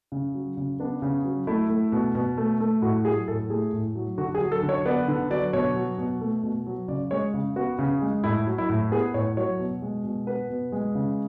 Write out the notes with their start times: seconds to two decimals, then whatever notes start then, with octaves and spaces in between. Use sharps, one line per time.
0.12 C#3
0.34 F#3
0.57 C#3
0.80 B3 D4
1.02 C#3
1.25 F#3
1.47 A3 E4
1.70 A3
1.92 B2
2.15 B2
2.38 A3
2.60 A3
2.82 A2 F#4
3.05 F#3 G#4
3.28 A2 A4
3.50 A3 G#4
3.73 A2
3.95 F#3
4.18 D3 F#4
4.35 G#4
4.41 F#3
4.52 A4
4.63 D3
4.69 C#5
4.86 B3 D5
5.08 D3
5.30 F#3 D5
5.53 B2 C#5
5.76 F#3
5.98 B2
6.21 A3
6.43 B2
6.66 F#3
6.88 C#3 D5
7.11 G#3 C#5
7.34 C#3
7.56 B3 F#4
7.79 C#3
8.02 G#3
8.24 A2 E4
8.47 F#3
8.58 E4
8.69 A2
8.92 B3 G#4
9.14 A2 C#5
9.37 F#3 C#5
9.59 B2
9.82 G#3
10.04 B2
10.27 B3 B4
10.50 B2
10.72 G#3
10.95 C#3